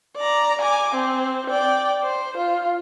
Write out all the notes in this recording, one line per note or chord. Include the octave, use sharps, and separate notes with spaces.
D5 A#5
G#5 D6
C4
D5 G5
C5
F4